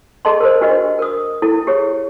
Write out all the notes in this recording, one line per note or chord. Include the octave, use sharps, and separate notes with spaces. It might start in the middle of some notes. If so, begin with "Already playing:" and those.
G#4 A4 D#5 A5 C6
A#4 C5
D4 F#4 G4 B4 D#5
A#4 D#6
E4 A4
G4 G#4 C#5